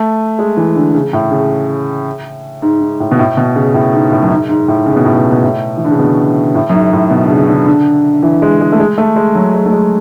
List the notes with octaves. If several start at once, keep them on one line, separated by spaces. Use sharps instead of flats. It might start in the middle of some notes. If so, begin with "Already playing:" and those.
Already playing: A3
G#3
E3
D3
C#3
A2
C#3
G#2
G#2
A2
B2
A2
B2
C#3
A2
G#2
A2
F#2
G#2
G#2
A2
C#3
B2
A2
B2
B2
A2
E3
D3
C#3
B2
A2
F#2
G#2
A2
B2
D3
C#3
D3
D3
E3
G#3
G#3
A3
G#3
A3
G#3
F#3
G#3
A3
G#3